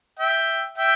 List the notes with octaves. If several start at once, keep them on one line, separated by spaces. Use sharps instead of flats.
E5 G5
E5 G5